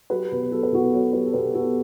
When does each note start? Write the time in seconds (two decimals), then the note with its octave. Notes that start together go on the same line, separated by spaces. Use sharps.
0.10 F#3 G4 B4
0.32 B2
0.52 F#3 A4
0.63 B4
0.72 B2 F#4 A4
0.92 F#3 A4 C#5
1.13 F#3 G4 B4
1.26 A4
1.34 B2 G4 B4
1.54 B2 F#4 A4